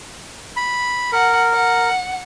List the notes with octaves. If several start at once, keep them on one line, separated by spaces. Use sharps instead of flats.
B5
A#4 F#5
F#5